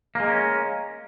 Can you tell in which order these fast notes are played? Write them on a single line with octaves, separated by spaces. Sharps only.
A#3 G#3 A#4 C#4